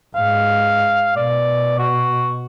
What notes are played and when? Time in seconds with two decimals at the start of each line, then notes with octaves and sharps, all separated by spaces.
0.15 G#2 F5
1.17 B2 D5
1.79 F#4